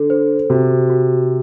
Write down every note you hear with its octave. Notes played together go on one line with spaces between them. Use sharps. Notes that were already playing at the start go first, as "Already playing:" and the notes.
Already playing: D3 A4
C5
C3 F#4
F#4